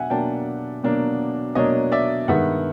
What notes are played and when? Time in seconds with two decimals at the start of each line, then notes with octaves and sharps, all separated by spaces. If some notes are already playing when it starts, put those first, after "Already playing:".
Already playing: B2 F#3 D4 E5 F#5 G#5
0.10 B2 F#3 A#3 D4 G5 A5
0.83 B2 F#3 A#3 D4
1.55 B2 F#3 A#3 D4 C#5 D#5
1.92 D5 E5
2.28 G2 D#3 G#3 B3 E5 F#5